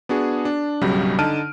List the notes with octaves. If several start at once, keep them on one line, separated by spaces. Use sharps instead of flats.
B3 D4 F#4 G#4
D4
B1 G2 C#3 F#3 G3
D3 D#4 A5 F6 D7 D#7